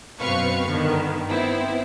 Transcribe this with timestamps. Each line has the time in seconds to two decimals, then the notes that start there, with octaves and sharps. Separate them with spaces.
0.21 F#2 B2 C4 B4 F5 C#6
0.68 G2 D3 D#3 B3
1.27 B3 C4 E4